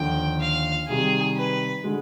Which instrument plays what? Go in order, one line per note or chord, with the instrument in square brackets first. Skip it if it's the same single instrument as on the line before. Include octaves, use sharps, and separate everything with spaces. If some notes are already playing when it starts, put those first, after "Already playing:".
Already playing: [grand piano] D#2 D3 F3 [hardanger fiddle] G5
[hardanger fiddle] F5
[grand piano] C3 D#3 G3 [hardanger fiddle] G#4
[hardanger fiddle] B4
[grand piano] D3 G#3